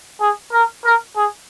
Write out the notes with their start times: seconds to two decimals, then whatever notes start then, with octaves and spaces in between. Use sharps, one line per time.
0.20 G#4
0.52 A#4
0.84 A#4
1.16 G#4